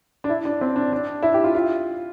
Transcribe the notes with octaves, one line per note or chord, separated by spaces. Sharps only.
D4
E4
D4
C4
D4
D4
E4
G4
F4
F4